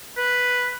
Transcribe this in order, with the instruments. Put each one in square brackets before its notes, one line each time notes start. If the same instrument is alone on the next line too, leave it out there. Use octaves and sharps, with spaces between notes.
[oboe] B4